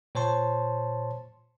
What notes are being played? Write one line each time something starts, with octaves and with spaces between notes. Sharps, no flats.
A#2 C5 C#5 A5 C6